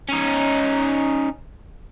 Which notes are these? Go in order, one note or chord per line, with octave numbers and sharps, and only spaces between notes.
C#4 D#4